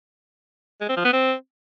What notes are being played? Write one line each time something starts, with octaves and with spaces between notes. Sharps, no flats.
G#3
C4
F3
B3
C4